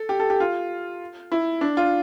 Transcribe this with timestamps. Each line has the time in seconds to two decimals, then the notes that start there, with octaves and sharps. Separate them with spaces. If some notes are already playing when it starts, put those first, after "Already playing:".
Already playing: A4
0.09 G4
0.20 A4
0.30 G4
0.40 F4
1.32 E4
1.61 D4
1.77 F4